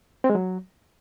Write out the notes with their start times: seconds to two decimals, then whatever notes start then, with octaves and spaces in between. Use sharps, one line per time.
0.24 C4
0.30 G#3
0.35 F#3